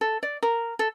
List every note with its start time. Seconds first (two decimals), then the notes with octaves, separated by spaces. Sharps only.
0.01 A4
0.23 D5
0.43 A#4
0.79 A4